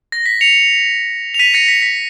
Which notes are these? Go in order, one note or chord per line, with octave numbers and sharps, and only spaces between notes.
A#6
B6
C#7 F7
F7
B6 D#7
A#6 C#7
B6
B6